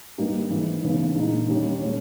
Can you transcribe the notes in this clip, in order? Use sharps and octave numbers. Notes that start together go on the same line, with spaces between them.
G#1 G2 G3 A#3 D#4
G#1 G#2 E3 G#3
D#2 C#3 E3 G#3 B3
A#1 A#2 G#3 D#4
D#2 D#3 G3 C#4
A#2 G#3 C#4